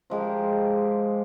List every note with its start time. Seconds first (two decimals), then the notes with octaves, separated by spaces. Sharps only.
0.10 F3 G#3 G4 A#4